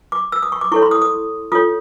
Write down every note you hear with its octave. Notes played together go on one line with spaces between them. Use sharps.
D6
E6
D#6
C#6
D6
E4 A4 C#5 C#6
C6
D#6
D#6
F4 A4 C#5 D#6